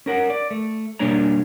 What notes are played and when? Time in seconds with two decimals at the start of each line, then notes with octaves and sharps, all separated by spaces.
0.06 C#4 A#4 F#5
0.30 D5
0.51 A3
0.99 B2 G3 A#3 D4 C#5 A#5